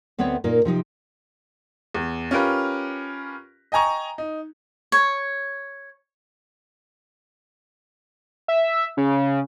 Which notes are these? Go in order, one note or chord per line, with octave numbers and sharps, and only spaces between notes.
D2 B3 C4 B4 C#5 E5
A#2 A#3 D#4 A#4 C#5
C3 F3 D#4 G4
E2
C#4 F4 G4 A#4 B4
D#5 G5 G#5 A#5 C#6
D#4
C#5
E5
C#3